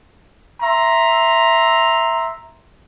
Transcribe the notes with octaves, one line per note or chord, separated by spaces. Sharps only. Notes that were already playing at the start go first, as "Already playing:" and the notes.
E5 A#5 C6